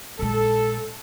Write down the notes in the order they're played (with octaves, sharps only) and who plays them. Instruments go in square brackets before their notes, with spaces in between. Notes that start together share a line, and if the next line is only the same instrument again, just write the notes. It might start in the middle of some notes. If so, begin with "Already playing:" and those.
[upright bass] A#1 G#3 [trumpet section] A4